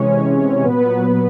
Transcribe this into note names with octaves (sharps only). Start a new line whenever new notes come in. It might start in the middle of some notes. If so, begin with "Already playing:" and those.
Already playing: C3 E3 G#3 C#4 C#5
A#2 F#3 B3 B4